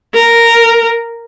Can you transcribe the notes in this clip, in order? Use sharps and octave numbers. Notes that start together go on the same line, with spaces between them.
A#4